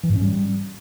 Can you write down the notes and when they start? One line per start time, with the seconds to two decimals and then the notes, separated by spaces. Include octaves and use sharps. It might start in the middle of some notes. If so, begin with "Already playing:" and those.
0.03 E3
0.10 G#2
0.16 C#4
0.22 G3